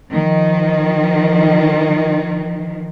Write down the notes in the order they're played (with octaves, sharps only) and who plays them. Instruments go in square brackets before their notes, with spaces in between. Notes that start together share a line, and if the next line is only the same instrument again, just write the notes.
[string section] D#3 F3